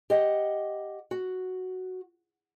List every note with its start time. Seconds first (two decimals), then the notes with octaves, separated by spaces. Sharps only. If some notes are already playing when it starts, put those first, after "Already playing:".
0.10 G4 D#5 F#5
1.11 F#4